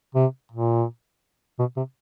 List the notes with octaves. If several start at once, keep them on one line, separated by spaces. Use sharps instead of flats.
C3
A#2
B2
C3